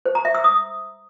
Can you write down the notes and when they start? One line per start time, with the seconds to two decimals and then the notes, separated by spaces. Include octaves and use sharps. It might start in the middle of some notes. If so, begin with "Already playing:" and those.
0.05 C5
0.15 A#5
0.25 E5
0.35 E6
0.44 D#6